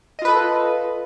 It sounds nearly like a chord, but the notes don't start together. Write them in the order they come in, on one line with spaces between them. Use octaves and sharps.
D#5 F4 B4 A4